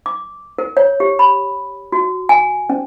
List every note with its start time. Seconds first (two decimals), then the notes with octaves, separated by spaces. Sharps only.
0.06 D6
0.59 A#4
0.77 C#5
1.00 G4
1.19 B5
1.92 F#4
2.29 G#5
2.70 C#4